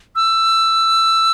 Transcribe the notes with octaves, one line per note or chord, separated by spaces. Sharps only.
E6